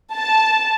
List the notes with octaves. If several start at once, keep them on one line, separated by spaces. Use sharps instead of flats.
A5